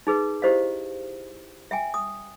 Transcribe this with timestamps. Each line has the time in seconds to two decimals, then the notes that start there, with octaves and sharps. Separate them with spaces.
0.07 D#4 G#4 B4
0.42 E4 G4 C5 D#5 F5
1.71 E5 G5 G#5
1.94 D#6